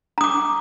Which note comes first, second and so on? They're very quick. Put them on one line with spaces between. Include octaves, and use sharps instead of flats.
A#5 D#6 D6